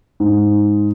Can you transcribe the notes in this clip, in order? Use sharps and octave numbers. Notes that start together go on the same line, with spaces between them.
G#2